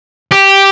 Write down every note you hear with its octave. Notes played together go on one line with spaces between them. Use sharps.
G4